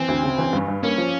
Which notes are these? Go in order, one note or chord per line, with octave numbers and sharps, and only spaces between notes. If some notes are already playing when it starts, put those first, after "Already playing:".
Already playing: E3 C4
D2
C#3
E3
G2
G2
A#3 C#4
F3